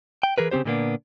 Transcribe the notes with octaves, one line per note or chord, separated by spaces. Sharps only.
G5
E3 G#4 A#4 B4
C#3 E3 C4 G4 C5
A#2 D3 G3 A#3 B3 D4